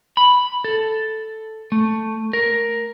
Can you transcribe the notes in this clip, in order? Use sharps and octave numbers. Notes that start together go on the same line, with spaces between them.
B5
A4
A3
A#4